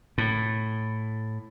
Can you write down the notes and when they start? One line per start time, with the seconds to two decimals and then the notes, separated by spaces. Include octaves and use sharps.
0.18 A2